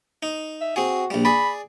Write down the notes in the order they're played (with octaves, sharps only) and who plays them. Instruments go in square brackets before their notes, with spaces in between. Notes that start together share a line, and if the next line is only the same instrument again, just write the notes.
[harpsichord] D#4
[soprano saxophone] E5
[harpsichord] C4 G#4 [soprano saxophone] F#4
[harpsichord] A#1 G3
[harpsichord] G#4 D5 [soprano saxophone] B5